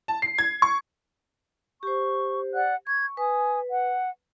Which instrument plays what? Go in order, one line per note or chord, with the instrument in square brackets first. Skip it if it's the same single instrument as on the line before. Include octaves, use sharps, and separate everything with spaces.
[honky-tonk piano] A5
C7
G#6
C#6
[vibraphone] G4 C5 [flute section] C#6
[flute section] D5 F#5 F#6
[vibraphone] C#6 [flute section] G#6
[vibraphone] B4 [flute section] G#5 D#6
[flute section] F#5